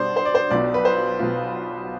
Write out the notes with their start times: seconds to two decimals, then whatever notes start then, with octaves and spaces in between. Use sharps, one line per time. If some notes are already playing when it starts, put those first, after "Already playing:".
Already playing: B2 G3 D4 C5 D5
0.16 C5
0.25 D5
0.35 C5
0.50 B1 B2 B3 F4 D5
0.74 B4
0.85 C5
1.19 B1 B2 B3 F4